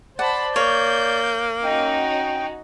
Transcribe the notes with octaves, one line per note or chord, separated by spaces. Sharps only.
C5 D5 F#5 A5 B5
A#3 C#5 G6
C#4 D#4 F#4 G5